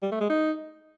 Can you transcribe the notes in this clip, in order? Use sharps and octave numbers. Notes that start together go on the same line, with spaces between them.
G3
A3
G#3
D#4